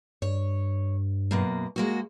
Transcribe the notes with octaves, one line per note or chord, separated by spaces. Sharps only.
G2 C#5
F#2 B2 A#3
G#3 A#3 F#4